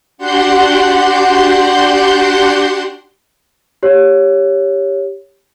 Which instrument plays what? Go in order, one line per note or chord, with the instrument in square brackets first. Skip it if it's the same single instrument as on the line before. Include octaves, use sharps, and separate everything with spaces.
[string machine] D4 F#4 G4 F#5 C6 G6
[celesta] G4 C#5